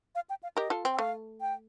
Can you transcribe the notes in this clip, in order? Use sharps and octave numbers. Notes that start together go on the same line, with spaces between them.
F5
G5
F5
G4 A#4 D#5
F4 A4
C4
G5
A3 F5
G5